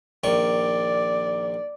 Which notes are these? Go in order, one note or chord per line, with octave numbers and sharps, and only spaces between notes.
A#1 D#3 D5 C#6